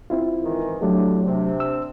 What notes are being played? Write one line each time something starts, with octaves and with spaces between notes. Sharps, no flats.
C4 E4 F4
G#2 D#3 E3
A2 D3 F#3 A3 D4 G4
C3 C4 D4
E6